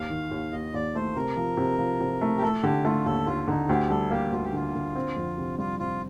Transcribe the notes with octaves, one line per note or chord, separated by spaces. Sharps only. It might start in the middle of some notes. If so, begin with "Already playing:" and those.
Already playing: D#2 F5
D#3
D#2
D#2 D#5
D#2 D5
A3 C5
C3 A#4
F3
C3
F3
C3
A3
G4
A3 A4
D3 G4
A3 F4
D#2 A4
D#2 F4
D3 D#4
D2 G4
G3 A4
A#3 G4
D2 F4
G4
D3 F4
D3
C4
F2
C3
G3 F4
C3 F4